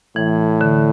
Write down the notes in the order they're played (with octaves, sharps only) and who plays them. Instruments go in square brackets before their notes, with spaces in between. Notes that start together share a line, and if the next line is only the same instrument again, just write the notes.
[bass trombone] A2 [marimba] E3
[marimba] D3